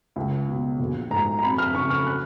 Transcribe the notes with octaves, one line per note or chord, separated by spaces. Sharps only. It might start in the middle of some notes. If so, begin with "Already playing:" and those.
C#2
B2 F#3
A#1
G#2 F#3 A#5
A#5
F2 B5
F6
C#3 F#3 C#6
F6
F#6